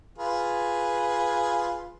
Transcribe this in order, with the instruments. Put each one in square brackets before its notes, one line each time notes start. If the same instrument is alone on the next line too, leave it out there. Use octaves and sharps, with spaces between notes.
[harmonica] F4 G#4 B4